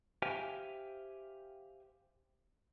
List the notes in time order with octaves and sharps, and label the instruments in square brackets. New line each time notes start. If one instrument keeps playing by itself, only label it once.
[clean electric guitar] G4 C5 E5 F5 G5 G#5